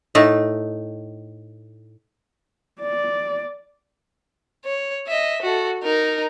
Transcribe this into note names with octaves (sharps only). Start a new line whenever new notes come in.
A2 A3 D#4
D5
C#5
D#5 E5
F#4 A4
D#4 A#4